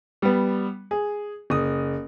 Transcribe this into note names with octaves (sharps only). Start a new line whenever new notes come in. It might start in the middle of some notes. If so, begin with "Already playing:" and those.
G3 B3
G#4
F#1 D#6